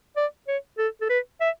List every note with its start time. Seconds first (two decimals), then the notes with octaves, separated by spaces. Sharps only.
0.17 D5
0.48 C#5
0.78 A4
1.01 A4
1.09 B4
1.40 E5